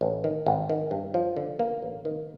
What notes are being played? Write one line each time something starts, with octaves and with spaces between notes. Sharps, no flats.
A1
D#3
G#1
D#3
G2
F3
D3
A#3
A1
D#3